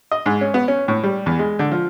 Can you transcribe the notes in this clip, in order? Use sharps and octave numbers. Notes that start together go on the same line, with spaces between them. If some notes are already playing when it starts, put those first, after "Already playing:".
D#5
G#2
C#4
B3
C#4
A2
G3
E2
G#3
D3
F3